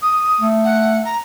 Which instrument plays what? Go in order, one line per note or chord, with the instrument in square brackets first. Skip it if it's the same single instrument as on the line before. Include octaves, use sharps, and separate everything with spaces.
[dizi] D#6
[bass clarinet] A3
[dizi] F#5
A#5